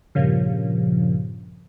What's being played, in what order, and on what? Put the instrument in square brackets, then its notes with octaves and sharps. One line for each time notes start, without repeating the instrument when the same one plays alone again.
[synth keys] G2 A#2 C#3 F3